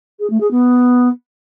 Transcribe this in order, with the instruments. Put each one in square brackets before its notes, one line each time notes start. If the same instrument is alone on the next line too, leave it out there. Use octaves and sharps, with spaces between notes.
[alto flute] G#4
A3
G#4
B3